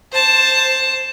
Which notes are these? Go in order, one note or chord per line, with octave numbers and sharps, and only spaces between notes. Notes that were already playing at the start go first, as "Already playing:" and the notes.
C5 A5